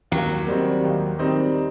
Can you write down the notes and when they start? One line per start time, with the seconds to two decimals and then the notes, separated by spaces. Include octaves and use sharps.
0.12 D#2 F#3
0.47 D#3 G3 C4 D#4
0.84 D#2
1.19 D#3 G3 C4 D#4